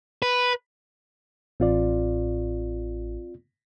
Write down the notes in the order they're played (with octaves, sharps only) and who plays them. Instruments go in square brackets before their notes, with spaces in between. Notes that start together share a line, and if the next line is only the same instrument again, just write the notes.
[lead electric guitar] B4
[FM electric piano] A1 [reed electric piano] C4 F4 D5